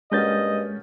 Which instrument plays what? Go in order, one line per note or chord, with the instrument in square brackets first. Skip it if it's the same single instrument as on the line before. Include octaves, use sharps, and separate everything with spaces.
[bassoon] G2 [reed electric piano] G#3 G6 A6 [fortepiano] A#3 C#4 F#4 [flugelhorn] D#5